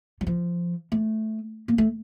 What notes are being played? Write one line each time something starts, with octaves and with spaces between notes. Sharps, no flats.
F#3
F3
A3
A#3
A3